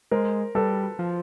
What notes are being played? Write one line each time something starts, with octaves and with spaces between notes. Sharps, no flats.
G#3 A#4 C5
G3 A4 B4
F3